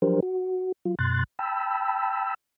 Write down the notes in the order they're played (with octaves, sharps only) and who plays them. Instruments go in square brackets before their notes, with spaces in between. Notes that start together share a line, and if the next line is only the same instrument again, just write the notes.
[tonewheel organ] F3 F#3 D4 G4 A#4 C5
F#4
F#3 F4
F#2 B2 C6 F#6 A6
G5 A5 B5 E6